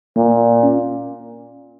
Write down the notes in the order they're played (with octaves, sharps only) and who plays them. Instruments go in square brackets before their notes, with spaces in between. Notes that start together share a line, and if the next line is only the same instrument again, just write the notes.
[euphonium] A#2 [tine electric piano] A#3
[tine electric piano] C#4